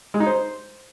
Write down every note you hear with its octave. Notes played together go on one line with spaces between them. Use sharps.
G#3
D#4
C5